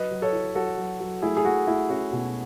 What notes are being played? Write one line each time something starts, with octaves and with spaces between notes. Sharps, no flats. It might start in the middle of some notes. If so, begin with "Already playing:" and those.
Already playing: F#3 B4 D#5
F#3
A4 C#5
E4
F#3 F#4 A4
F#3
F#3
A3 E4 G#4
G#4
A3 F#4
A3 E4
C#4 F#4
B2